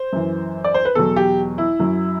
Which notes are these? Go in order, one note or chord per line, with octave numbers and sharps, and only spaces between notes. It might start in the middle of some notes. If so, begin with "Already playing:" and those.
Already playing: C5
F#2 E3
D5
C5
B4
E2 B2 F#3 A4
G4
E4
F#2 F#3